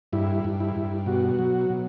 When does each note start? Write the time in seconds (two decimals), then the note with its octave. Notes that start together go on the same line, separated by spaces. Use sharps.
0.13 G2 E4
0.44 G2
0.60 E4
0.76 G2
1.06 B2 F#4
1.39 F#3
1.70 B2